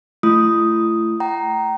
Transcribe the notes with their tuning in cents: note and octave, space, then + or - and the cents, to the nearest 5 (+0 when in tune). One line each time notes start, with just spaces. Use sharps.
A3 +10 E4 +45 D#6 +0
G5 -35 A#5 +0